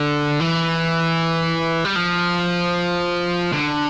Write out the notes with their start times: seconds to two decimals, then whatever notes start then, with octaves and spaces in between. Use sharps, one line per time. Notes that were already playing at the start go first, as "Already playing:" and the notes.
Already playing: D3
0.40 E3
1.85 G3
1.96 F3
3.52 D3